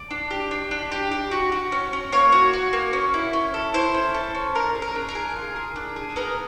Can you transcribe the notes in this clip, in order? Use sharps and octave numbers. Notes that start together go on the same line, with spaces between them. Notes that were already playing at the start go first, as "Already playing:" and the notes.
Already playing: D5
D4
G4
D4
D4
G4
G4
F#4
F#4
C#4
C#4
A#3 C#5
F#4
F#4
A#3
C#4
E4
C#4
A4
E4 C5
C#4
A4
C#4
D4 A#4
G#4
A#4
D4
A#4
G#4
F4
G#4
D4
G#4
B3 A#4